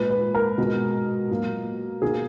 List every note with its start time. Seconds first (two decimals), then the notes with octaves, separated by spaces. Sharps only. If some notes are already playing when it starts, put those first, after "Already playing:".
Already playing: A#2 G#3 B4
0.10 B4
0.35 A#4
0.58 B2 G#3
1.30 A#2 F#3 A#3
2.02 B2 A#3 G#4